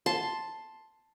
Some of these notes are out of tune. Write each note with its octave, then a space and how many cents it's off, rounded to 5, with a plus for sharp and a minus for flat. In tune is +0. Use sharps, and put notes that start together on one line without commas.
A5 +0 C6 +0